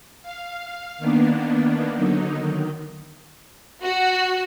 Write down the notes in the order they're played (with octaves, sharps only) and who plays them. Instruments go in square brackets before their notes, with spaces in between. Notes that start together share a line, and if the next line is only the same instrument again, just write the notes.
[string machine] F5
D#3 A#3 B3 D4
D3 F#3 D#4
D#3
[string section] F#4